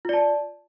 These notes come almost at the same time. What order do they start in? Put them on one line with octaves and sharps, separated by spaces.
F4 D5 A5